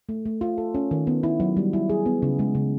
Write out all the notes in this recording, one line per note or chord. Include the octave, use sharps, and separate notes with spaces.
A3
A3
F4
A4
C#4
D#3
B3
E4
F#3
G3
E4
G#4
B3
C#3
G#3
C#3